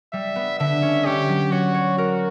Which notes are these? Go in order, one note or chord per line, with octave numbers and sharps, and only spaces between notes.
G3 E5
B3
D3 E5
C#4
C#4 G4
F#3
F#4 C#5
C#5
F#4 A#4